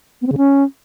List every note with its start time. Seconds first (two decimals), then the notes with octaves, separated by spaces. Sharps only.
0.22 B3
0.27 C4
0.32 C#3
0.37 C#4